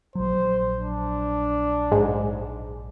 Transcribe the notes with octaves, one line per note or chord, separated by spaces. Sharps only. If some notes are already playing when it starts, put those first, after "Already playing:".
A#1 F#3 C5
D4
G#2